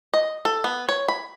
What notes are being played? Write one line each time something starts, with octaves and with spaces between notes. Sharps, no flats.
D#5
A4
B3
C#5
B5